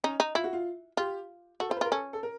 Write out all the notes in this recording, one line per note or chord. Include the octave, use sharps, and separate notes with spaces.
C#4 D#4
D#4
E4 F4
F#4
F4
F4 G4
F#4 A4
F4 C5
B4
F4 A#4
C#4 A4
A4
A#4